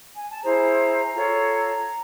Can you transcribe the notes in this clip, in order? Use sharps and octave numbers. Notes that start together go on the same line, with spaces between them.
G#5
A5
E4 G#4 C5 A#5
F4 A4 C#5